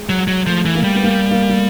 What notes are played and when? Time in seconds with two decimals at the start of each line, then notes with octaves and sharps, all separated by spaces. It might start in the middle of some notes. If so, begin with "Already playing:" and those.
Already playing: G#3
0.09 F#3
0.28 F#3
0.47 F3 A3
0.66 E3
0.75 A#3
0.84 G3
0.95 B3
1.03 A#3
1.31 A#3
1.41 A3
1.49 A#3